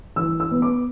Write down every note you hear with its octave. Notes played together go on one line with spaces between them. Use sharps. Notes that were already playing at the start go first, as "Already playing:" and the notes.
E3 E6
E6
B3
D6